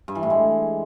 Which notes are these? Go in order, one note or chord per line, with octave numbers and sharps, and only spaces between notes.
G2
E3
A2
G#3